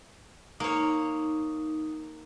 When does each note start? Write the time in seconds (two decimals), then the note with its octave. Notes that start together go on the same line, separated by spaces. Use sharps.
0.60 A#3 D#4 C#5